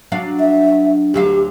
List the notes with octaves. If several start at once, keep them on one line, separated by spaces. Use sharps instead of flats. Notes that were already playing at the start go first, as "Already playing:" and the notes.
F#3 D4 F5
E5
D2 F#3 G4 F5